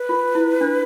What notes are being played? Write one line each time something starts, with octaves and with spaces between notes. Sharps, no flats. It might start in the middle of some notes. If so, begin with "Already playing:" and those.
Already playing: B4
F4
E4
D4